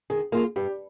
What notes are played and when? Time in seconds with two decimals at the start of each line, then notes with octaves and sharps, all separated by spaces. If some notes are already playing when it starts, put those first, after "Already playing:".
0.10 D#3 G#4
0.32 A#3 F4 G#4
0.56 G2 G4